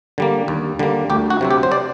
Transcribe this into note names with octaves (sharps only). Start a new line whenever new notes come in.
D3 G3 A#3
D#2
D3 G3 A#3
D2 G4
F#4
C3 F#3 C4
G4
C5
D5